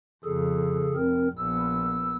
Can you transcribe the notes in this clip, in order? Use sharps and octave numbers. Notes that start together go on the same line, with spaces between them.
F2 C#3 G#4 A4
F1 C4 A#4
A#1 B3 E6